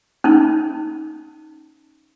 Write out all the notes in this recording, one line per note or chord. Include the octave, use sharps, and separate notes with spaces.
C#4 D#4